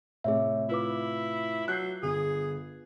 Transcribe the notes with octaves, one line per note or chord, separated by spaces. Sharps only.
A2 C3 G#4 C#5 E5
E4 F4 B4 D6
F#3 F#6 G6 C7
G1 G#4